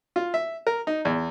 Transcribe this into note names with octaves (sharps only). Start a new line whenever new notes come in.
F4
E5
A#4
D#4
E2